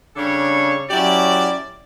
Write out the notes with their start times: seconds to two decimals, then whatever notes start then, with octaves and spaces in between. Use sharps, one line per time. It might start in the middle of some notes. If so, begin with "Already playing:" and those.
0.15 C#3 G3 D4 A4 C#5
0.89 F#3 C#4 E4 G4 D5